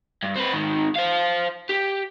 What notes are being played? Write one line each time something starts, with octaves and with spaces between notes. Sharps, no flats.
G2
C4 B4
G#2 D#3
C5 F5
G4